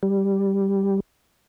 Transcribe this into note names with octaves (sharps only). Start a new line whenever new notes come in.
G3